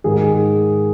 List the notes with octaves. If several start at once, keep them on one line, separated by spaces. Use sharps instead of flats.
G#2 D#3 G#4